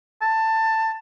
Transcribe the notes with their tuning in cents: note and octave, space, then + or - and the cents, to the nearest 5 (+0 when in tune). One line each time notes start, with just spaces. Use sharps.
A5 +15